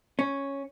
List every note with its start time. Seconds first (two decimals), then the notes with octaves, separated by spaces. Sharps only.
0.19 C#4